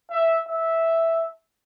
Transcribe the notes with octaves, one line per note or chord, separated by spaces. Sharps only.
E5
E5